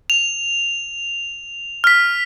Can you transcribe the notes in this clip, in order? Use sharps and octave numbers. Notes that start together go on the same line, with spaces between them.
F7
F6 B6